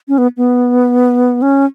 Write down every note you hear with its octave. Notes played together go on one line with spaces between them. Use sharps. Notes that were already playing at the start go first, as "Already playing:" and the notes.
C#4
B3
B3
C#4